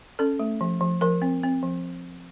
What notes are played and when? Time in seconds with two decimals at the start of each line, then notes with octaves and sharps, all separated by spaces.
0.19 C#4 A4
0.39 A3
0.61 F3
0.81 F3
1.01 F3 A#4
1.22 C4
1.43 C4
1.63 F3